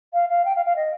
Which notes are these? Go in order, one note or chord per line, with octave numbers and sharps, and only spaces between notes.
F5
F5
G5
F5
F5
D#5